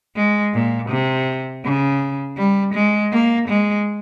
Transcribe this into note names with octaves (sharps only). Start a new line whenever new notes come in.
G#3
A#2
C3
C#3
G3
G#3
A#3
G#3